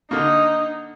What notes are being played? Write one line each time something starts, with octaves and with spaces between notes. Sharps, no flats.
D3 A#3 D#4